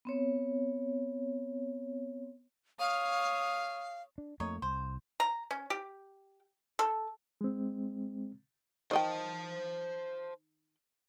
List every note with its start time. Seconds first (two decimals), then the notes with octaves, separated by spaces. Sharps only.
0.05 B3 C4 C#5
2.79 C#5 F5 D#6
4.18 D4
4.40 F2 A3 A#3 D#4 C#5
4.62 C2 C5
5.20 A#5
5.51 C#4
5.70 G4
6.79 A4
7.41 G#3 C4
8.91 D#3 C5 D#5 G5 A5